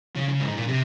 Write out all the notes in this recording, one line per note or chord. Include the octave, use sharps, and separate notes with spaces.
C#3
C#3
G#2
A#2
C3